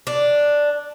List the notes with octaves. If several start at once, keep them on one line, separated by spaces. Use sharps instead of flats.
D4